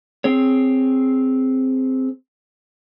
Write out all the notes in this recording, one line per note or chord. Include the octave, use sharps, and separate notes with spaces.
C4 G#4 C#5